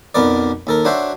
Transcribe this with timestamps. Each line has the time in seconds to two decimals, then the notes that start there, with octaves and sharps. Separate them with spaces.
0.15 B1 F2 B3 A#4 D5
0.67 D#2 A4 A#4
0.85 F#3 D4 F#4 C5 E5